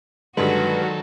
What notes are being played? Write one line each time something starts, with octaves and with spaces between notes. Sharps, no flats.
G2 D3 D#3 F#3 G#3 F#4 A4 B4